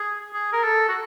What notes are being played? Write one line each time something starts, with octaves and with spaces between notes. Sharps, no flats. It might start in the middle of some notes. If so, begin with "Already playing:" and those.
Already playing: G#4
G#4
A#4
A4
F#4